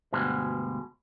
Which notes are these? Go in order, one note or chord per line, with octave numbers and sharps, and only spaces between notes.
D2 G2 B2 G#3